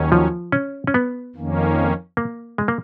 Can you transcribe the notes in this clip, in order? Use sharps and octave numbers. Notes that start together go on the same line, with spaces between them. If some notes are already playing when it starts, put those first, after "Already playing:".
Already playing: D#2 D#3 F#3 C#4
F3
C#4
C#4
B3
F2 D#3 A#3 C#4
A#3
G#3
A#3